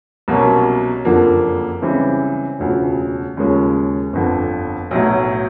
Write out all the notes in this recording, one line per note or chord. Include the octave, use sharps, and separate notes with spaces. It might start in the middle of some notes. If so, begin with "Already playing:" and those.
C2 B2 F#3 A#3 C#4
F#1 F2 D3 F3 A#3
C#2 C#3 E3 G3 C4
E1 D2 C#3 F3
D#2 C#3 F3 G#3 C#4
G1 F2 D3
B1 A2 F#3